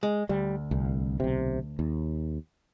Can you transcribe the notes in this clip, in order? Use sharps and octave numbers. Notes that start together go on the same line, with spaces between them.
G#3
D2 G3
C2
B1 C3
D#2